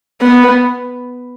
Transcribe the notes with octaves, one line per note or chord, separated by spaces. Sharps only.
B3